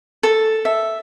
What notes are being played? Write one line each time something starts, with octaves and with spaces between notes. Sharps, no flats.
A4
E5